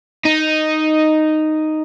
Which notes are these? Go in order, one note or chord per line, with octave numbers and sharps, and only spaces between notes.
D#4